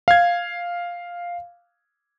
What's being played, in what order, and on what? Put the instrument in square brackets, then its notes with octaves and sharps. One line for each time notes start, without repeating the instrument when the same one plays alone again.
[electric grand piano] F5 G#6